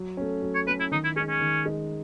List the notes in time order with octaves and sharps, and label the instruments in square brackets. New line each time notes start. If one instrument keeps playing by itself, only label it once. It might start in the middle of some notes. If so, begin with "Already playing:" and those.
Already playing: [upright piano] F#3
A3 C#4
F#3
[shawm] C#5
[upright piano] A3 C#4 [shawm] B4
[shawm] E4
[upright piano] D#3 [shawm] D#4
[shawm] E4
[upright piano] G#3 [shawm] C#4
[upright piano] D#4
[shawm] C#4
[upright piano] D#3
G#3 D#4